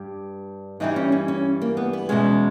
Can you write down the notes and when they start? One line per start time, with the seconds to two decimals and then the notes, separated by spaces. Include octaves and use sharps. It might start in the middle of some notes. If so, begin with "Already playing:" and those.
Already playing: G2 G3 G4
0.80 G2 E3 G3 D#4
0.96 C#4
1.12 C#4
1.28 C#4
1.62 A#3
1.77 B3
1.93 B3
2.09 E2 B2 G#3 C#4